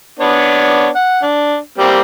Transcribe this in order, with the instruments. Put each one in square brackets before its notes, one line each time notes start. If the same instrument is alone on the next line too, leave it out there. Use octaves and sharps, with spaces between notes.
[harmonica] B3 D4 C#5
F#5
D4
G3 A#3 C4